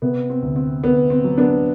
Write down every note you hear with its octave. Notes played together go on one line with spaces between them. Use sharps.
C3 B3
C4
D2
C4
D2 B3
C4
F#3
B3 D4